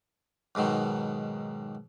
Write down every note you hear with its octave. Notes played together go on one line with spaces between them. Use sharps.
B1 G#2 B2 D#3